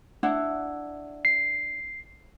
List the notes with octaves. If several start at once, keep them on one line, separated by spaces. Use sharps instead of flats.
D4 E4 F#5
C7